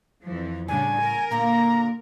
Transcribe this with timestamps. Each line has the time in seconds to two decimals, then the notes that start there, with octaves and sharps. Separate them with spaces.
0.24 F2 E3 F3
0.68 A2 C#3 G3 D4 G#5
0.99 A#4
1.31 A#2 D3 A#3 A#5